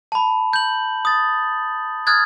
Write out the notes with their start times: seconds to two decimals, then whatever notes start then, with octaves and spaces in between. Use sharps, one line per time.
0.12 A5 B5
0.53 G6 F#7
1.05 D#6 A6
2.07 D#6 F6 F#6 G#6 A6